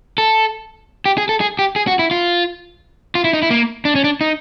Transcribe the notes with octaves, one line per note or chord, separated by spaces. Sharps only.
A4
G4
G#4
A4
G#4
G4
G#4
F#4
E4
F4
F4
E4
D#4
E4
A#3
D4
C#4
D4
D#4